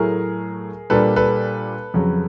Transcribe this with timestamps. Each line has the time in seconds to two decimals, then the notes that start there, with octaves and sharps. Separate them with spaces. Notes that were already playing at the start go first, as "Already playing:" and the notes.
Already playing: A2 F#3 A3 G#4 A#4
0.90 A#2 G3 A#3 D4 A4 B4
1.16 A4 B4
1.94 F2 C#3 F#3